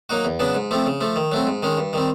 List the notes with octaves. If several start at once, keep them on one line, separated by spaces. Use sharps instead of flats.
F#3 A#3 D#4 F#4
E2
C#3 F#3 B3 D4
G#2
F3 A3 C4
C#3
F3 A3
D#3
F#3 A3 C4
G#2
D#3 G#3 C#4
G2
D#3 G3 C4